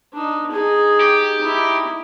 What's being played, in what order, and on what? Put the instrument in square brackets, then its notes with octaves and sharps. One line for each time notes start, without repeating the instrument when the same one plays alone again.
[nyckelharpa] D4 D#4
D#4 G#4
[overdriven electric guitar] G4
[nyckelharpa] D#4 E4